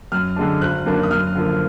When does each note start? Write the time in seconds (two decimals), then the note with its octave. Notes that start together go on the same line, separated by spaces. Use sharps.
0.12 F#2 F6
0.36 D3 G#3 D4
0.61 G#1 F#6
0.86 F#2 D#3 A#3 D4
1.03 D#6
1.11 F#2 F6
1.35 D3 F3 A#3